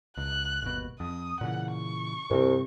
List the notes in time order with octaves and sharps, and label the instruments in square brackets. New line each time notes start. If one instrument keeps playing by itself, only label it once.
[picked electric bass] C#2 [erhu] F#6
[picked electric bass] G1 D#2 B2
[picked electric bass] F2 [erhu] D#6
[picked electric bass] A#2 C#3 E3 [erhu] F#5
[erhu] C#6
[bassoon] C2 [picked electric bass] G2 C3 C4